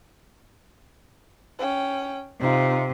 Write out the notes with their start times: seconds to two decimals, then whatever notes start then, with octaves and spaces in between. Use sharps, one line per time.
1.59 C#4 G5
2.41 C3 D#4 F4